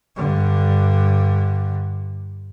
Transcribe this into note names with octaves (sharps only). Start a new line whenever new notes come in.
G2 D3